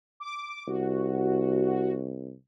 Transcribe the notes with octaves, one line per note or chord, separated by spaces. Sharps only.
D6
C2 F#4